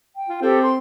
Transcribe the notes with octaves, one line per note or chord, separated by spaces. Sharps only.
G5
F4
C4 G4 A4
C6